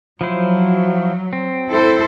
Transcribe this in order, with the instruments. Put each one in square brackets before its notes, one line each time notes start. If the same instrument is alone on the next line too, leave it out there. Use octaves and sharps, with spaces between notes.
[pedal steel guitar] F3 E4 C5 [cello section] F#3
[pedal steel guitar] C4
[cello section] E4 A4 C5